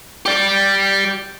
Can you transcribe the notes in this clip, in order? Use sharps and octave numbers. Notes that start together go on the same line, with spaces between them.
G4 D5